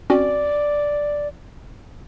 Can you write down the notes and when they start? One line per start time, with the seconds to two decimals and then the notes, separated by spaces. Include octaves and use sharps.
0.10 C4 C#4 F#4 D5